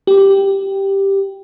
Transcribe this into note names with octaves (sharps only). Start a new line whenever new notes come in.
G4